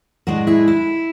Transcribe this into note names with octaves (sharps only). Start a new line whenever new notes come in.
A2 G#3 D4 F#4
E4 G#4
E4